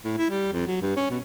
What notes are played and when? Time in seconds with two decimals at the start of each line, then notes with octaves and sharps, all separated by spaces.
0.04 A2
0.17 E4
0.30 G3
0.52 F2
0.67 F#3
0.81 G2
0.96 C#4
1.10 B2